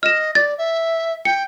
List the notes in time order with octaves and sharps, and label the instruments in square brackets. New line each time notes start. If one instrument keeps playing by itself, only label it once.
[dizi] D#5 [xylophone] F6 E7
[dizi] D5 [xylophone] A6
[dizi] E5
[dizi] G5 [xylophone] C#7